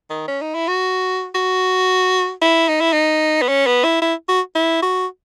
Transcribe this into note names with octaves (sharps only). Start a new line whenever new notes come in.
D#3
C#4
D#4
E4
F#4
F#4
E4
D#4
E4
D#4
B3
C#4
B3
E4
E4
F#4
E4
F#4